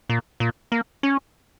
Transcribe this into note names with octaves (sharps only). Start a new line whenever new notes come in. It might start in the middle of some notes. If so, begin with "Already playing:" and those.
A#2
A#2
A#3
C#4